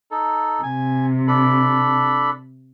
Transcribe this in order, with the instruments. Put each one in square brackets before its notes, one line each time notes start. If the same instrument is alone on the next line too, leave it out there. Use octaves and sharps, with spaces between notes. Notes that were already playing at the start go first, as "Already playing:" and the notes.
[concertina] D#4 A4
[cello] C3 [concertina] G#5
[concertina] D4 A4 B5